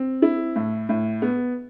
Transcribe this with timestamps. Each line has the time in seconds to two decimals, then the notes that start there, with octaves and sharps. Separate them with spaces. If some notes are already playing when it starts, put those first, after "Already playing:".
Already playing: C4
0.22 E4
0.56 A2
0.89 A2
1.22 B3